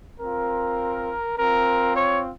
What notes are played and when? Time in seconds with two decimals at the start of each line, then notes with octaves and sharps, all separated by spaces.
0.20 C4 F4 A#4
1.37 C4 F4 A#4
1.95 C#5